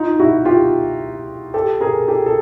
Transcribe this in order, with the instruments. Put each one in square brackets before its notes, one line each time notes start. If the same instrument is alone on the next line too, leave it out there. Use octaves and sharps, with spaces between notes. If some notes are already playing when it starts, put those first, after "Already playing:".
Already playing: [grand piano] D#4 F4
E4 F#4
F4 G4
G4 A4
G#4 A#4
G4 A4
A4